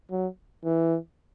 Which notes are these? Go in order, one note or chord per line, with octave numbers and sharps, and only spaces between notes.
F#3
E3